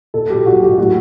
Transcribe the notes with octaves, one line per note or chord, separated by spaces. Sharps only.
A#2 A4
F#3 G4
A#2 F#4
F#3 G4
A2 F#4